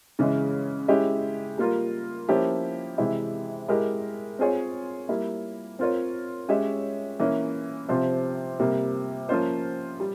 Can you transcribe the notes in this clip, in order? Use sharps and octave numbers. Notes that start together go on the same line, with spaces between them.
C#3 E3 G#3
G#3 C#4 E4 G4
G3 A#3 F4 A#4
F3 A#3 C#4 E4 G4
C3 E3 G#3 E4
G#3 E4 G4 A#4
C4 F4 G#4 C#5
G3 A#3 E4
C4 F4 A#4 C#5
G#3 C#4 G4 C#5 E5
E3 A#3 C#4
C3 F3 C4 F4 C5
C3 G3 A#3
F3 A#3 C#4 F4 C5
G3